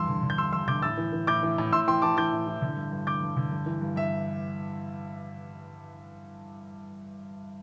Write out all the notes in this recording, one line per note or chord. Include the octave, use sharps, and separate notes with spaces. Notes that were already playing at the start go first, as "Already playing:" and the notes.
Already playing: E2 G2 C6 E6
D3
D3
G6
G2 C6 E6
G2 C6 E6
D3 D6 G6
A2 E6 A6
E3
E3
A2 D6 G6
E3
A2
A2 C6 E6
E3 G5 C6
E3 A5 D6
E3 D6 G6
A2
E3
D3
G2
G2
D3 D6 G6
G2
D3
G2
E3
G2
G2 E5